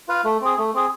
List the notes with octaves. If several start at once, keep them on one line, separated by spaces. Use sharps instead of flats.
F4 B4 F5
A3
C4 G#4
A3
C4 G#4